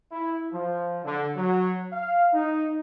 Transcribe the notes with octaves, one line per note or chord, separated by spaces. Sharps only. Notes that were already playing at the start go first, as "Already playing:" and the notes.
E4
F3
D3
F#3
F5
D#4